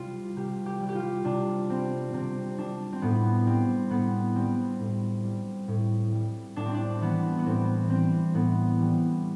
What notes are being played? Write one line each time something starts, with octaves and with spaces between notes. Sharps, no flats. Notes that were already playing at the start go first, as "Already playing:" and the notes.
Already playing: C3 G3 F4
C3 G4
G4
G3
G4
F4
C3 D4
G3 C4
C3 C4
G3 D4
C4
A2 B3
G3 C4
A2 B3
G3 C4
A2
G3
A2
G3
A2 D4
C4
D4
E3 G3 B3
B3
A2 C4
E3 G3 C4
A2 B3
E3 G3